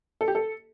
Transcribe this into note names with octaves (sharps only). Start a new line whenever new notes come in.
A4
G4
A4